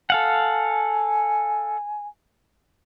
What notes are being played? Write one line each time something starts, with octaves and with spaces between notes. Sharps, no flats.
A4 F5 F#5 G#5